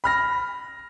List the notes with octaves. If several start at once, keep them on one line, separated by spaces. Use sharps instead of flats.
B5 F6 A#6